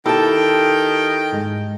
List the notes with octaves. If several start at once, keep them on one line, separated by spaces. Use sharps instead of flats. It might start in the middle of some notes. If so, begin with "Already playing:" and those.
D#3 E4 G4 A4 G5 A5
G#2 G#3